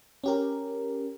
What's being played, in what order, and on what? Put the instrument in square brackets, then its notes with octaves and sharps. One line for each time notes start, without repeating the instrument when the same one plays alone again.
[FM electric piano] C#4 G4 A#4